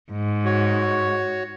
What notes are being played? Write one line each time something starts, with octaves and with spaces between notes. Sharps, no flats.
G#2
F#4 C#5